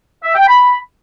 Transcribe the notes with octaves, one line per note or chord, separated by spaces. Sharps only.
E5
G5
B5